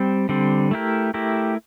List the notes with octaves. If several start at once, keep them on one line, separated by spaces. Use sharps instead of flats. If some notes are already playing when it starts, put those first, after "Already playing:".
Already playing: G3 C4
D3 G3 C4
A3 E4 G4 A#4
A3 E4 G4 A#4